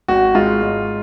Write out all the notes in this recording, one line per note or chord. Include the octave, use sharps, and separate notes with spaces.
G#1 F#4
G#2 F4
G#1